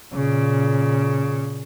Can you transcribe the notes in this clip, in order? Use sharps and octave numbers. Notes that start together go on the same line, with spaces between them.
A#2 C#3